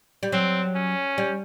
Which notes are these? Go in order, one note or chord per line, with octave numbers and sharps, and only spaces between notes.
G3
F#3 C4
C#4
G3